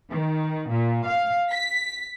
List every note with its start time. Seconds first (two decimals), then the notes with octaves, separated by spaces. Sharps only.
0.12 D#3
0.70 A#2
1.07 F5
1.51 B6